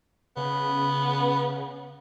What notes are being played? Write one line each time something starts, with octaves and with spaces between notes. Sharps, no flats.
C#3 B3